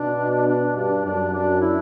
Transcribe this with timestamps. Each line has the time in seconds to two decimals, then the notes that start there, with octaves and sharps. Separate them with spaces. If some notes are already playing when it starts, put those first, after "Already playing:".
Already playing: B2 D4
0.48 D4
0.75 G2 D4
1.05 F#2 D4
1.33 D4
1.61 E4